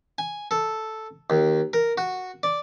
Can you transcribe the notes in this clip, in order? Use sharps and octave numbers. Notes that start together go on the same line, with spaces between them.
G#5
A4
D#2
A#4
F#4
D5